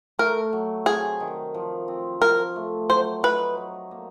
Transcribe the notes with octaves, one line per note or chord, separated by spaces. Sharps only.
A3 A#4
F#3
C3 G#4
D#3
F3
C4
F3 A#4
A3
F#3 C5
D#4 B4
F#3
A#3